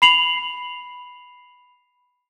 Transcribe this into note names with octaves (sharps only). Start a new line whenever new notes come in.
B5 C7 F7 F#7